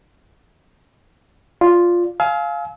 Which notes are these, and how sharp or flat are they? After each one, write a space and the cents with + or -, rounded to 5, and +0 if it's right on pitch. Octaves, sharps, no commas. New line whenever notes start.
F4 +0 D5 +0
F5 +0 G#5 +30 E6 -35